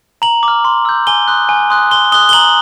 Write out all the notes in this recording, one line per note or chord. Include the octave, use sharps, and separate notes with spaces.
A#5 F#7
D6
F6
C6
E6 G6
G#5 G7
C6 D#6 F#6
G#5
C6 D#6 F#6
C6 G7
D#6 F#6 G7
G7
A#5 F#7